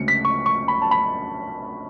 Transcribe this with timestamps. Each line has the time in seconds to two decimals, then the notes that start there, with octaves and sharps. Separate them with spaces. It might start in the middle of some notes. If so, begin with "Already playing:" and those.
Already playing: D2 C#3 G#3 C#4 C#7
0.08 B6
0.25 C#6
0.46 C#6
0.68 B5
0.82 A5
0.91 B5